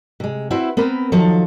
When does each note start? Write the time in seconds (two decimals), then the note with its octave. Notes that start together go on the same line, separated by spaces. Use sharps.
0.20 C3 G#3
0.50 C4 E4 F#4 B4 C5 E5
0.77 B3 C4 A#4 B4
1.12 D#3 F3 F#3 A4